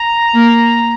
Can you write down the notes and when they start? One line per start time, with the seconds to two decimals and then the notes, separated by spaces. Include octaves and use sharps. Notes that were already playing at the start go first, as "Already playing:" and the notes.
Already playing: A#5
0.34 A#3